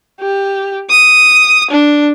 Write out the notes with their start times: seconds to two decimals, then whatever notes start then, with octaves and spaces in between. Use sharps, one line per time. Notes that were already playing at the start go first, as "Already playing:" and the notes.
0.20 G4
0.90 D#6
1.71 D4